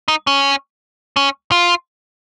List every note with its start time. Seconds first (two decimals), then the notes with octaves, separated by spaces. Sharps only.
0.08 D#4
0.27 C#4
1.17 C#4
1.52 F4